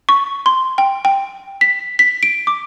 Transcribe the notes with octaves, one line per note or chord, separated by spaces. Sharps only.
C#6
C6
G5
G5
B6
B6
D7
D6